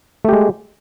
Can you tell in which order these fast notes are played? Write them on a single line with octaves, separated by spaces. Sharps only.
A3 G4 G#3